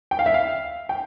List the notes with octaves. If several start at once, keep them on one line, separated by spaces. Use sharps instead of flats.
G5
F5
E5
F5
G5